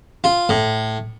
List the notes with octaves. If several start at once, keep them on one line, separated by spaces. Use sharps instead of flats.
F4
A2